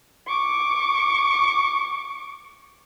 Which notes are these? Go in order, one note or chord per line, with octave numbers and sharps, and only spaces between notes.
C#6 D6